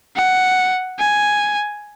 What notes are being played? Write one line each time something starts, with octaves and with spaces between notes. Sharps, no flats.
F#5
G#5